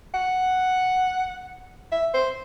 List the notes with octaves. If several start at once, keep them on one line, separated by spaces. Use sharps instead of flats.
F#5
E5
C5